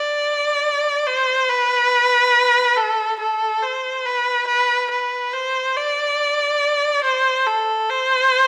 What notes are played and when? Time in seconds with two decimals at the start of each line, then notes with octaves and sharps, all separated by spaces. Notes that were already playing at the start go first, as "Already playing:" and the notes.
Already playing: D5
1.07 C5
1.49 B4
2.77 A4
3.20 A4
3.62 C5
4.05 B4
4.47 B4
4.91 B4
5.33 C5
5.76 D5
7.04 C5
7.47 A4
7.90 C5